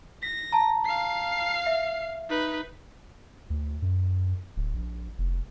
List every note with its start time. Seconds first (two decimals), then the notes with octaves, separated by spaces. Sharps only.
0.23 A#6 B6
0.52 A5 A#5
0.86 F5 C7
1.66 E5
2.29 D#4 B4
3.50 D2
3.82 F#2
4.56 D1
4.75 A#1
5.18 F1